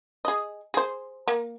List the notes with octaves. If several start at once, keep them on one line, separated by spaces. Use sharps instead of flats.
G#4 D#5
G#4 C5
A#3